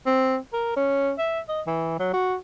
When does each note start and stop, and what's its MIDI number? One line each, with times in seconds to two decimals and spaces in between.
0.06 0.37 60
0.53 0.74 70
0.76 1.12 61
1.18 1.40 76
1.48 1.61 75
1.67 1.96 52
1.99 2.09 54
2.13 2.36 66